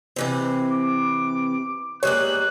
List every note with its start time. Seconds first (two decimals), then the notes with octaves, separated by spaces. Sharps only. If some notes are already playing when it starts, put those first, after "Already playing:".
0.16 C3 E3 C4
0.70 D6
2.03 G3 G#3 A#3 C#5 F#6